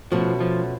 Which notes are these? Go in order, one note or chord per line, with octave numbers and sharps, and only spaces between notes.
B2 F3 A3 C#4 F#4
F3